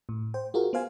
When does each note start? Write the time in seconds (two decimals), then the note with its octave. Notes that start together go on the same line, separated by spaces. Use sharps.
0.09 A2
0.34 C5 G5
0.54 F4 F#4 G#4 A#4
0.73 B3 C5 F5 G#5